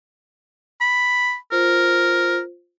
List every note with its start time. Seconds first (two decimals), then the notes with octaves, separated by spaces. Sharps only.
0.81 B5
1.52 F4 A#4 C5